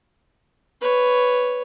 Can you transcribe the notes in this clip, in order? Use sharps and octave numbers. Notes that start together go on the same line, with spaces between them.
B4 C#5